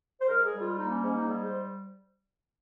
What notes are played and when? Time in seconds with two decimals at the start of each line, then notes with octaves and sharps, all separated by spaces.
0.21 C5
0.28 G#2 A#4
0.45 G#4
0.53 G3
0.61 F4
0.78 A#3 D#4
0.91 C#4
1.03 G#2 C#4
1.16 D#4
1.27 G3 G#4
1.45 C5